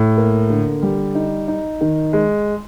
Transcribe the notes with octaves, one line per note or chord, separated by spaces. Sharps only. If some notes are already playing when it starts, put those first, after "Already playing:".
Already playing: A2
A#3
D3
G3
D#4
D#4
D#3
G#3